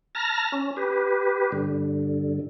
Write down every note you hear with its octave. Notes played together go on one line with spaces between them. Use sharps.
A5 A#5 F6 A#6
C#4
G4 B4
G2 D3